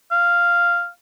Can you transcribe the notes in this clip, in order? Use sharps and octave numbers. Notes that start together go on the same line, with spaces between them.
F5